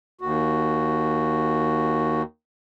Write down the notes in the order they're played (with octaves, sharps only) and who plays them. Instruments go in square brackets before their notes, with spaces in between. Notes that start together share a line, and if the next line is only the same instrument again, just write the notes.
[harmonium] D#2 F#4